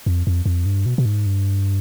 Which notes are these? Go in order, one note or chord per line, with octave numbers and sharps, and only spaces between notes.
F2
F2
F2
G2
B2
B2
G#2
G2